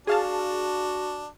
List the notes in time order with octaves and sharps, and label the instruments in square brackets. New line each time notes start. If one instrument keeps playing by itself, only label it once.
[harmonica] D4 [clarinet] F#4 [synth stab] G#4 F5 A5